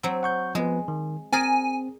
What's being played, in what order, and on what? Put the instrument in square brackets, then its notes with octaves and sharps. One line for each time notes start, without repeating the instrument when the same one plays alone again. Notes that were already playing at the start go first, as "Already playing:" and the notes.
[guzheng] F#3 C4
[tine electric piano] F#5 C#6 G6
[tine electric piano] F3 B3 B4 [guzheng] G#3
[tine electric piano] D#3
[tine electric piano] C4 [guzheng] G#4 A#4 D5 [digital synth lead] G#5